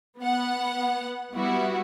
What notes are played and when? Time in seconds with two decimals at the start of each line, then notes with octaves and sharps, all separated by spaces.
0.19 B3 F#5
1.34 G3 B3 E4 F#4